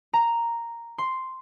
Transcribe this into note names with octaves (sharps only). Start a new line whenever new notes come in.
A#5
C6